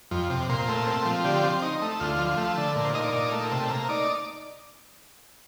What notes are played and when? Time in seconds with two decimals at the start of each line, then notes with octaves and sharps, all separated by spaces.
0.11 F2
0.30 C3
0.49 A#2 C5
0.68 A3
0.86 C4
1.05 F3
1.24 D3 G4
1.43 C4
1.62 D#4
1.82 A3
2.00 D2 F4
2.18 F3
2.37 A3
2.57 D3
2.76 A#2
2.84 C5
2.95 D#4 D#5
3.04 D5
3.13 A#2
3.32 A3
3.51 C3
3.70 A#3
3.89 D#4 D5